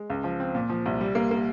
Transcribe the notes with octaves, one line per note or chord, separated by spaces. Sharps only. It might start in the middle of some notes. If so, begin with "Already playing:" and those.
Already playing: G#3
C#2
F3
C4
A#2
F3
C2
G3
A#3
A#3